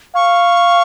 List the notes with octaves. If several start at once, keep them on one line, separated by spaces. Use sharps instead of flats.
F5 C#6